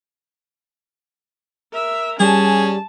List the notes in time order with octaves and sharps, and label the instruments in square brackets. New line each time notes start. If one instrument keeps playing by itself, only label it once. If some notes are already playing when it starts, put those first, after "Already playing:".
[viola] A#4 E5
[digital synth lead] G3 [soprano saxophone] C#4 [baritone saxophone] G#4 [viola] A5